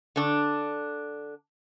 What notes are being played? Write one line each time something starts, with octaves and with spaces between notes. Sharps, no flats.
D3 D4